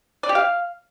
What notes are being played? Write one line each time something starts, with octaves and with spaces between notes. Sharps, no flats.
D5
G4
F5